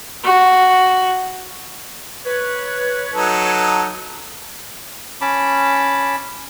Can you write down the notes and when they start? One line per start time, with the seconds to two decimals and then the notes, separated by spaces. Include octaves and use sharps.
0.25 F#4
2.25 B4 C#5
3.13 F#3 D#4 A4
5.21 C#4 A5 B5 D6